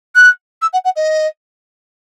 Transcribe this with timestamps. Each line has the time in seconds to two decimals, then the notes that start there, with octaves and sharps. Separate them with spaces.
0.15 F#6
0.62 E6
0.73 F#5
0.84 F#5
0.96 D#5